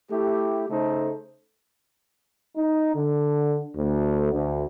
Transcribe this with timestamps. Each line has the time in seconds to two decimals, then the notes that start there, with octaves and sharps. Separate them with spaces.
0.10 A3 E4 G4
0.69 C#3 A3 D#4 A4 C5
2.57 D#4
2.95 D3
3.77 D2
4.32 D2